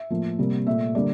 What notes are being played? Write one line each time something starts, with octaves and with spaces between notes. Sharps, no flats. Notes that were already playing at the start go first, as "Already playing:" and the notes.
Already playing: E5
A2 F3 A#3
C3 G3 A#3
A#2 A3 E5
D3 G3 A#3 D5